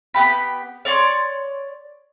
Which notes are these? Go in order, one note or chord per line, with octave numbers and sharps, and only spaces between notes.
B3 D4 G4 B5
C#5 D5 C6 C#6